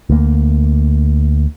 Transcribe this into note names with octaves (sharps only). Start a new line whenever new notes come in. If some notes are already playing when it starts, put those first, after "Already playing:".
D2 A#3